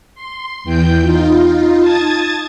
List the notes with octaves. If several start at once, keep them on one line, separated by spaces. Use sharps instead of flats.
C6
E2 E3 G5 G6
D#4 F4
A5 D#6 G#6 A6